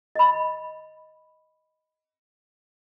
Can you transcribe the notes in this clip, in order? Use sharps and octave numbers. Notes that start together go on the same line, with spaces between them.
D#5 B5